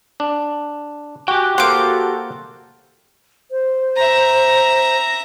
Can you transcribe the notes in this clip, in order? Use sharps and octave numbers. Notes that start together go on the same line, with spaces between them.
D4
F#4 G4 G5 G#5 D6 F#6
A#3 F#4 A4 C5 F5 F#5 D6
C5
E5 A#5